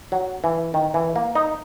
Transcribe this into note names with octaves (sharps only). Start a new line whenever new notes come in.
F#3
E3
D#3
E3
A#3
D#4